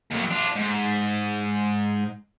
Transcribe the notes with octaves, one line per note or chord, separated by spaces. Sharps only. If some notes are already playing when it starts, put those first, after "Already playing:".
D#2 F#3
D4 F4
G#2